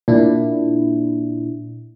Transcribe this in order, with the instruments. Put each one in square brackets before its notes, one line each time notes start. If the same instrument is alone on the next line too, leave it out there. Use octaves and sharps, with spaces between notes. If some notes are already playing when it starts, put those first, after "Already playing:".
[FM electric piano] A#2 D4 E4